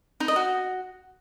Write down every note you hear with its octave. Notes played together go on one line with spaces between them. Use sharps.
D#4
D#5
F#4